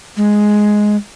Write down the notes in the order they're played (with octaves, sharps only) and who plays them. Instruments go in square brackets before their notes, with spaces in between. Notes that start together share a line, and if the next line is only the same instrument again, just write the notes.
[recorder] G#3